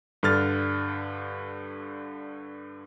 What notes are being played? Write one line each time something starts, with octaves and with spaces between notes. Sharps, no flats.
G2 D3 F6 A6